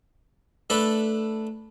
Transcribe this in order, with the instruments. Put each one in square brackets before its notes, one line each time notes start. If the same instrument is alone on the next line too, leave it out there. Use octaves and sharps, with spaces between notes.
[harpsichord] A3 D4 A4 B4